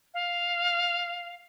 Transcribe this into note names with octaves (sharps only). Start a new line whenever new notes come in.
F5